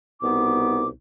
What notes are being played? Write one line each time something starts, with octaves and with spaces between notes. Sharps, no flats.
C2 B2 B3 D#4 D6